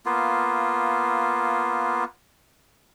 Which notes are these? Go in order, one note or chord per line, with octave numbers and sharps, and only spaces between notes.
A#3 B3 F4